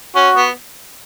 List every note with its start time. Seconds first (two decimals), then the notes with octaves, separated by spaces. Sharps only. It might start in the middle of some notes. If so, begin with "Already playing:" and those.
0.15 C#4 F#4
0.36 B3